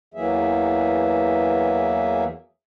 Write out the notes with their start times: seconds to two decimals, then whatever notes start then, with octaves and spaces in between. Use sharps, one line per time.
0.14 E2 E3 F#3 A#3 G#4 E5